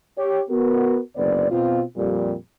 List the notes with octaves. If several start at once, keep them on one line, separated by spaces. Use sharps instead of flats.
G4 C#5
B3 F#4 A#4
F#1 D2 B3 C4 D5
B2 C4 F4
F2 A#2 G3